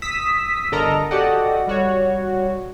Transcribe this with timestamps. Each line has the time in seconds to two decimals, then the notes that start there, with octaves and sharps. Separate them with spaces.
0.02 D#6 E6 B6
0.72 G1 D3 A4 A#4 D#5 A#5
1.11 F#4 G4 A4 D5 D#5 F#5
1.67 G3 F#4 C#5